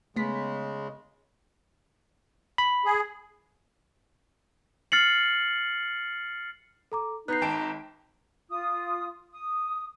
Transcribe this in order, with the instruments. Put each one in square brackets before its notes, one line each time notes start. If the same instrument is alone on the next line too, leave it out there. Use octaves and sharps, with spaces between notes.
[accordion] C#3 G#3 [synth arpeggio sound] A3 B3 B6
[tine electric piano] B5
[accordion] G#4
[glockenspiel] F6 A6 C7 C#7 F#7
[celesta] A4 A#5 D6
[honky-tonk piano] B3 [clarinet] D#4 [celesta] F#6 G6 C7
[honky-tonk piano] G#1 A5 D7 [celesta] G5
[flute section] F4 D#6
D#6